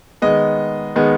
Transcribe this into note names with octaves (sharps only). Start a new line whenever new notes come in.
D#3 G#3 B3 D#5
D#3 G#3 B3